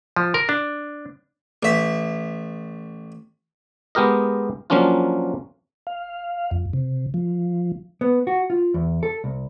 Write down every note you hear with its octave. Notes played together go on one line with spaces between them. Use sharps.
F3
A#4
D4
A1 E5
G#3 B3 G4 A#4 D#5
F3 F#3 A#3 C#4 D4 F4
F5
F2
C3
F3
B3
F#4
F4
E2
A4
C2